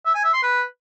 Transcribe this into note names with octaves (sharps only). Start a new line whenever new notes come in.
E5
G#5
E5
C6
B4